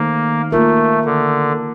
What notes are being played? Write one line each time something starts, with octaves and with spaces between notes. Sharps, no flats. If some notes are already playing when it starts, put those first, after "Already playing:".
Already playing: D#3 A3 A#3 D#4 A4 C5
A3 A#3 F4 A#4
D3